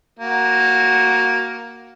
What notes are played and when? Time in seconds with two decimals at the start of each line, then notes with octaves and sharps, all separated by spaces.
0.19 A#3 F#4